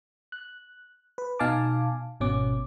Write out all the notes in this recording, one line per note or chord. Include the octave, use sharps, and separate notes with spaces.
F#6
B4
B2 D#4 F5 G#5 A5 D6
G#1 B2 C#4 D6